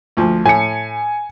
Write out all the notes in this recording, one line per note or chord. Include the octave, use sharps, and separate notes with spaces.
D2 F3
A2 G#5 C#7